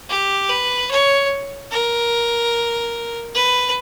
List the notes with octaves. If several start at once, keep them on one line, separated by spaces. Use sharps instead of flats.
G4
B4
C#5
A#4
B4